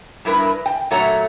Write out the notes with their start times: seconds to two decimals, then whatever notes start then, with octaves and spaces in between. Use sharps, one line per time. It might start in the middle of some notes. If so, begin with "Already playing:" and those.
0.25 G2 E4 A#4 B4
0.66 G5
0.91 A#2 F#3 A3 C#5 F#5 A#5